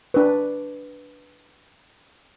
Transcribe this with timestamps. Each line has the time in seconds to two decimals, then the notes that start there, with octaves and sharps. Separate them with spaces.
0.14 D4 B4